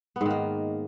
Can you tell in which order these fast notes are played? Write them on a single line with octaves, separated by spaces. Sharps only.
B3 G#2 D#3 A#3